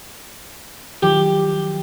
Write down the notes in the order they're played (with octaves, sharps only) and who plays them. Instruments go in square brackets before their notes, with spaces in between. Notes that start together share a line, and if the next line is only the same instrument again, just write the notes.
[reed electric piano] D#3 F3 F#3 [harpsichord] G4